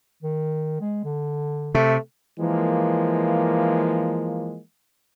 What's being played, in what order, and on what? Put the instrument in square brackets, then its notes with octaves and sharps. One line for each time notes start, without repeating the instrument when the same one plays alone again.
[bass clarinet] D#3
G#3
D3
[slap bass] C3 [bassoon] A3
[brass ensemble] E3 F3 G#3 A#3